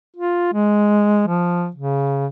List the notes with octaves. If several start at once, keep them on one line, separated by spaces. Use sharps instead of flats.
F4
G#3
F3
C#3